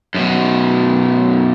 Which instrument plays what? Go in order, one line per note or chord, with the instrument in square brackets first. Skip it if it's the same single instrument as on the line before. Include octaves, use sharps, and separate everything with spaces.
[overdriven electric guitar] F#2 B2